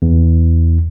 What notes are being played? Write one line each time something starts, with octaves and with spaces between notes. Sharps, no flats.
E2